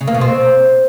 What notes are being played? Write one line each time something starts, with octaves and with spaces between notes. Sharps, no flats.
C#3
A#3
B2
C4